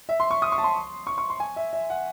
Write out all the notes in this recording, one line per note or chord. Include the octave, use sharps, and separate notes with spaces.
E5
C6
C#6
D#6
C#6
A5
C6
C#6
C#6
C6
G#5
E5
E5
F#5